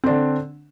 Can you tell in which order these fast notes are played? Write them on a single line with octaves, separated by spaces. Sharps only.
C4 D4 D3